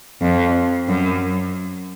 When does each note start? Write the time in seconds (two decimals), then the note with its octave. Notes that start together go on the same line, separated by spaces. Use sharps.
0.22 F2
0.88 F#2